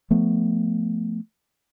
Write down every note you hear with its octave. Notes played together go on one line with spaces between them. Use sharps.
F3 A3 B3